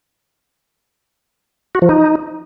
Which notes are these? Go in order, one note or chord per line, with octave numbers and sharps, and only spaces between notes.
F#4
F3
D#4